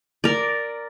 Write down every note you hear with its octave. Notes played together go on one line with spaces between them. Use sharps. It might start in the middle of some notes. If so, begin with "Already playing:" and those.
A#4 D5